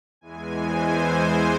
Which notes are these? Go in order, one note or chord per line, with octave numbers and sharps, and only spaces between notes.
E2 E3 G#3 G#5
C5
C5